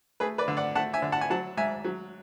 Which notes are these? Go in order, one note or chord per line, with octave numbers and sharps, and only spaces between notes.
A3 G#4 B4
B4 D5
D3
D5 F#5
A3 F#5 A5
E5 G#5
D3
F#5 A5
G#5
F#3 F#5 A5
G#2 E5 G#5
F#3